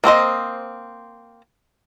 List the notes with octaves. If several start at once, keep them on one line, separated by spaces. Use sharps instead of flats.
A#3 C4 C5 D#5